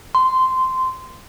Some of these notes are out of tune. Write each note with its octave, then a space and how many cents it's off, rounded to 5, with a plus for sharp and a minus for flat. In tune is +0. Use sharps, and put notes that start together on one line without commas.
C6 -10